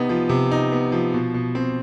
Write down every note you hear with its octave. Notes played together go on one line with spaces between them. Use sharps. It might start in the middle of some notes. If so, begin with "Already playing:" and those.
Already playing: C3 B3 D#4
F3
C3
D#4
B3
F3
B2
B2
C4